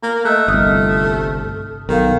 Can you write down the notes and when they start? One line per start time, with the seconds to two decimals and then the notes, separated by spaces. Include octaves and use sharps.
0.03 A#3
0.25 A3 D#5 E6 F#6
0.48 G1 C2 D#6 F6
1.89 B1 D#3 A4 F5